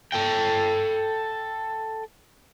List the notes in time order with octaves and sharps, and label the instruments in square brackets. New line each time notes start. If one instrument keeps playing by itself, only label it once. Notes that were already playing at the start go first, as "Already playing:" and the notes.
[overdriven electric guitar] A4 G5